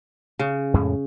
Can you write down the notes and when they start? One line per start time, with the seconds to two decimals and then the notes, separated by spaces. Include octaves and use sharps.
0.39 C#3
0.74 F2 A2 G#3